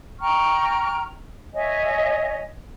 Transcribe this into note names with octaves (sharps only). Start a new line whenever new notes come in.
G5 A#5 C#6 F6
C#5 D#5 E5 G#5